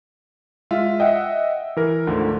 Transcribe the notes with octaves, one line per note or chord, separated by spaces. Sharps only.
G#3 F4 E5
D#5 E5 F#5 G5
E3 A#4
D2 G#2 D3 F3